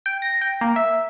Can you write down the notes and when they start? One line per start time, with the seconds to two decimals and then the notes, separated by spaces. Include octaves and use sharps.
0.06 G5
0.22 A#6
0.41 G5
0.61 A#3
0.76 E5